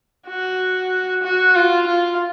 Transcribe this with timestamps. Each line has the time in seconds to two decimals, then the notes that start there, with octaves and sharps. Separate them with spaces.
0.28 F#4
1.24 F#4
1.55 F4
1.88 F4